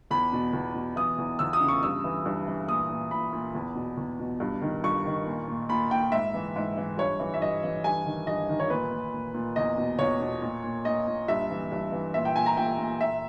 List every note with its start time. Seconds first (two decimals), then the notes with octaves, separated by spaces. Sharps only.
0.11 E2 B5
0.33 B2
0.53 E2
0.74 B2
0.96 E3 D#6
1.18 E2
1.39 E2 E6
1.53 D#6
1.60 C#3
1.68 C#6
1.83 G2 E6
2.04 E3
2.26 G2
2.48 E3
2.68 A#2 D#6
2.89 A#2
3.11 A#2 B5
3.33 A#2
3.55 E2
3.75 B2
3.97 E2
4.20 B2
4.40 G2
4.62 D#3
4.84 G2 C#6
5.05 D#3
5.27 A#2
5.48 A#2
5.69 A#2 B5
5.90 A#2 G5
6.12 G#2 E5
6.34 E3
6.56 G#2
6.77 E3
6.98 G2 C#5
7.20 E3
7.34 E5
7.42 G2 D#5
7.63 E3
7.84 G2 G#5
8.06 D#3
8.27 G2 D#5
8.49 D#3
8.60 C#5
8.70 A#2 B4
8.91 A#2
9.14 A#2
9.34 A#2
9.56 E2 D#5
9.78 B2
9.99 E2 C#5
10.20 B2
10.42 A#2
10.64 A#2
10.85 A#2 D#5
11.07 A#2
11.28 G2 E5
11.50 E3
11.72 G2
11.92 E3
12.14 A#2 E5
12.25 G5
12.36 A#2 G#5
12.46 A#5
12.57 A#2 G5
12.79 A#2
13.01 A#2 E5